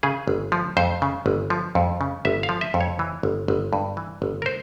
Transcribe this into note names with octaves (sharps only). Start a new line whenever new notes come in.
C#3 G#4
G1
F3
F2 C5
C#3
G1
F3
F2
C#3
G1 E5
F5
F3
E5
F2
C#5
E3
G1
G1
G2
E3
G1
A#4
C5